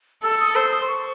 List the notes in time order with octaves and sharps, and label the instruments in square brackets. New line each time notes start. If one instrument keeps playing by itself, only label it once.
[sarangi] A4 [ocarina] E6
[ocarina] D#6
[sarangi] C5 [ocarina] E6
[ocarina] D#6
C6
C#6